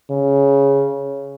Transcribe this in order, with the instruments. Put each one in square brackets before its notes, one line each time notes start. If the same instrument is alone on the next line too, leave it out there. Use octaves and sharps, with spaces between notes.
[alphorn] C#3